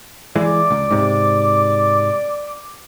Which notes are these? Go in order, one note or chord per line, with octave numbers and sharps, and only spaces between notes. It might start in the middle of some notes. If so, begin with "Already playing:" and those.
E3 G#3 D5 D6
C#2
G#2 C3